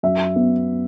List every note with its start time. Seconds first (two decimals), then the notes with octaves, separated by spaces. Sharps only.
0.03 F#2 E5
0.36 B3